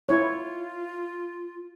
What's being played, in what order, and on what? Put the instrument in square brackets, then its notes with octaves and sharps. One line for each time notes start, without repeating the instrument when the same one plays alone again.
[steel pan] E4 C#5 [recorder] F4